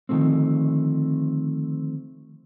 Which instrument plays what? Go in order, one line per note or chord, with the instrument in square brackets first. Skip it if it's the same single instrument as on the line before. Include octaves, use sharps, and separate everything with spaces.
[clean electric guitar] D3 D#3 F3 A3 C4